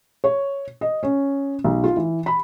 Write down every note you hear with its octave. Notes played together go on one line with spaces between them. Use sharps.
C#5
D#5
C#4
B1
F4
E3
B5